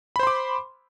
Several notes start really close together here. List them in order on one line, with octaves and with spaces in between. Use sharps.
B5 C5 C6 D6